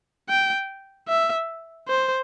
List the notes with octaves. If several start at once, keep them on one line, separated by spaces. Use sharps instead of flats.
G5
E5
C5